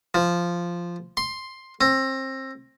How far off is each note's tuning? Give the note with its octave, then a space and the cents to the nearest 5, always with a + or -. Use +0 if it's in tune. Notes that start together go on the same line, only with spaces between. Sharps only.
F3 -5
C6 +5
C4 +25